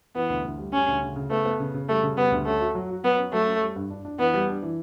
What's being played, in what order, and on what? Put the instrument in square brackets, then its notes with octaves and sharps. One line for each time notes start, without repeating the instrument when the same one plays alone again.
[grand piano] E3 [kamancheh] B3
[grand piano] D2
D2
G3
[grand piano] G3 [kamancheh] C#4
[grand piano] D2
C#3
C#3
[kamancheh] A3 [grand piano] B3
[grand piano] B3
C#3
C#3
[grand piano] G3 [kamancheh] A3
[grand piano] C#3
[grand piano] G3 [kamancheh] B3
[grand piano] D2
[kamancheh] A3 [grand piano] C#4
[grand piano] F#4
F#3
F#4
[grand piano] F#3 [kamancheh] B3
[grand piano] C#4
[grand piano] F#3 [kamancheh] A3
[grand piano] C#4
G3
G2
D4
D4
[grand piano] E3 [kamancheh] B3
[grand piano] G3
D4
E3